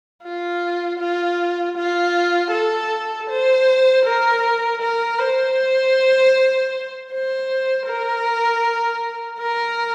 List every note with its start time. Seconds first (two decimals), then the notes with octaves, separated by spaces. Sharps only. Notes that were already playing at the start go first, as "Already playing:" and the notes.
0.24 F4
1.00 F4
1.77 F4
2.52 A4
3.29 C5
4.06 A#4
4.81 A#4
5.19 C5
7.11 C5
7.87 A#4
9.39 A#4